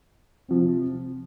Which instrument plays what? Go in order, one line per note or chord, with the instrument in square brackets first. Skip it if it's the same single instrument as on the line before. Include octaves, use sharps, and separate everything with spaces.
[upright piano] C3 F3 C4